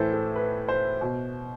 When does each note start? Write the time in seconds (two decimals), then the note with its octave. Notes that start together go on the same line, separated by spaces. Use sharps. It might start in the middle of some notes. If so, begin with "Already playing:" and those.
Already playing: A2 E3 A4 C5
0.14 A4
0.36 B4
0.69 C5
1.01 B2